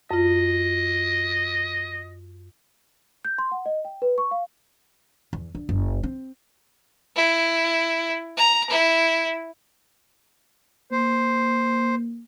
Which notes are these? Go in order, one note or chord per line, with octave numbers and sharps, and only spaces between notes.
F#2 F4 D#5
G6
C6
F#5
D#5
G5
B4
C#6
F5
E2
D3
F#1
C4
E4
A#5
E4
A#3 C5